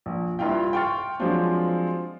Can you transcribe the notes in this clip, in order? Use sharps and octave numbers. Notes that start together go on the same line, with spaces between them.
A#1
G2 E4 F4 F5 G5
G5 C6 C#6 F6 A6
F3 F#3 G#3 C4 D4 F4